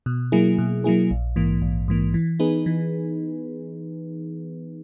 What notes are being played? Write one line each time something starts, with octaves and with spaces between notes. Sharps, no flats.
B2
F#3 A#3 E4 G#4
B2
F#3 A#3 E4 G#4
A#1
G#2 E3 A#3
A#1
G#2 E3 A#3
E3
B3 D#4 G#4 B4
E3